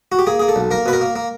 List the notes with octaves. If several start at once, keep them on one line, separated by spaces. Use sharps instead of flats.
F#4
G4
A#3 G#4
A#3 G#4
A4
B1
A#3 A#4
B2 B4
A#4
A#3
A#3